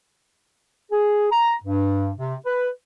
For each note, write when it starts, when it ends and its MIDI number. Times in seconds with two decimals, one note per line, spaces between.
0.91 1.27 68
1.31 1.54 82
1.64 2.11 43
2.17 2.36 48
2.46 2.69 71